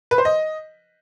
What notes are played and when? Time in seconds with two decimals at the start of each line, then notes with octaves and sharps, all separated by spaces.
0.11 B4
0.18 C5
0.25 D#5